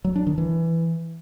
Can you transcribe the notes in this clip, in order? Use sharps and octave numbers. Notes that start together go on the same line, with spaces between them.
F#3
D4
D#3
E3